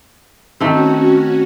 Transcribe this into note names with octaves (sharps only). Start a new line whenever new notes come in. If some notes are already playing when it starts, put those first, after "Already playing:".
D#3 A3 C4 C#4 F#4